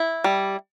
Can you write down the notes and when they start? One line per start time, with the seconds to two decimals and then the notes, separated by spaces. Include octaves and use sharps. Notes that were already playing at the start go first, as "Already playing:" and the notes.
Already playing: E4
0.24 G3